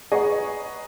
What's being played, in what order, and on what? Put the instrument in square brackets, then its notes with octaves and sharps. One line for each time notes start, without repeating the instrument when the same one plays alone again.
[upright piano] G#4 B4 D#5 F#5 A#5 C#6